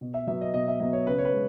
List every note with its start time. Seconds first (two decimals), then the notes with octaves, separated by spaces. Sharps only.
0.01 B2
0.14 E5
0.27 F#3 B3 E5
0.41 D#5
0.54 B2 D#5
0.68 E5
0.80 F#3 B3 D#5
0.93 C#5
1.06 C#3 B4
1.18 C#5
1.25 B4
1.33 G#3